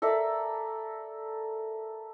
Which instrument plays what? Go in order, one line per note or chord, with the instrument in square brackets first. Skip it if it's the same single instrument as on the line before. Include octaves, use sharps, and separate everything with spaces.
[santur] A4 A#4 D5 E5